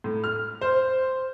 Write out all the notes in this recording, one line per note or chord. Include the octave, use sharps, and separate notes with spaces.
A2
F6
C5